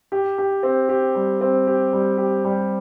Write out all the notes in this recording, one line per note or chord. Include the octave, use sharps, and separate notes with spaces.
G4
G4
C4
G4
G3
C4
G4
G3
G4
G3